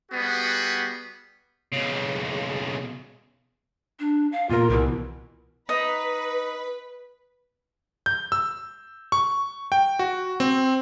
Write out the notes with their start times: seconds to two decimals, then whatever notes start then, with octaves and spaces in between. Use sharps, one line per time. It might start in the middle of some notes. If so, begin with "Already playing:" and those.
0.12 G3 B3 F#4 G#4
1.72 B1 C#3
3.99 D4
4.32 F5
4.49 E2 A#2 F4 A#4
4.70 C2 B2 E3 A#4
5.69 D#4 B4
8.06 G6
8.32 E6
9.12 C#6
9.72 G5
9.99 F#4
10.40 C4